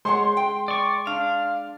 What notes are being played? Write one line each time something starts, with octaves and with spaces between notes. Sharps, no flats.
G#3 C5 C#5 F#5 C6
G5
D5 C#6
D4 F5